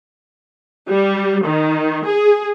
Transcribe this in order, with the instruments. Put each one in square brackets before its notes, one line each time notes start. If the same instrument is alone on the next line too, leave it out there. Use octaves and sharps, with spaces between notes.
[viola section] G3
D#3
G#4